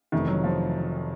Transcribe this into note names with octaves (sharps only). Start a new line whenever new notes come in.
F1 F2 C3 D#3 E3 A3
F#3
F3